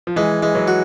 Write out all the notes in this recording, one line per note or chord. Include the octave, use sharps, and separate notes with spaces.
F3
E3 G#3
E3 G#3
E3 F#3
F#4